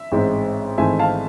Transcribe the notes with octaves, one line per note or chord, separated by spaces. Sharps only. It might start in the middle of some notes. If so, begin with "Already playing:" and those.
Already playing: E5
A1 G#2 G#3 C4
G#1 G#2 E3 A3 C4 E5 G#5
F5 A5